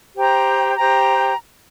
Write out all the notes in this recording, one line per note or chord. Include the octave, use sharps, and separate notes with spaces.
G4 C5 G5 A#5
G4 C5 G5 A#5